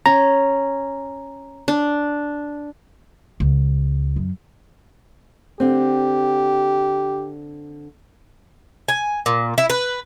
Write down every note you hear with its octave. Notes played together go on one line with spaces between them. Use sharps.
C#4 A#5
D4
C#2
F#2
D3 C4 G4
G#5
A#2
E4
B4